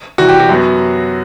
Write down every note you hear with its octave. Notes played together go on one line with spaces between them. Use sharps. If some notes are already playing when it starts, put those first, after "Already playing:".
C3 E3 G3 F#4
G4
F#4
F#2 F#3 B3